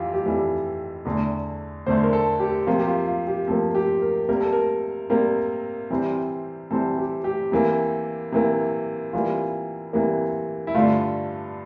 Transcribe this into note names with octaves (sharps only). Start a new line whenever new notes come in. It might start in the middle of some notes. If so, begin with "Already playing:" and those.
Already playing: F2 E3 F4 G4
G4
F2 E3 G3 A4
E2 D3 A3
E2 D3 A3 C5
A#4
A4
G4
C3 F3 A#3 F4
G4
F4
F4
G4
C3 F3 A#3 A4
G4
A#4
C3 G3 A#3 A#4
A4
A#4
C3 G3 A#3
C3 E3 G3 C4
C3 E3 G3 C4 A4
G4
G4
C3 E3 A#3
C3 E3 A#3
C3 E3 G3 A#3 F4
C3 E3 G3 A#3
E4
G2 D3 A3 F4